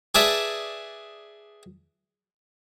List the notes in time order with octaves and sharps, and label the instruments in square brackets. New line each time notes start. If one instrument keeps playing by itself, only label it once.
[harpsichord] G#4 B4 D5 E5 A5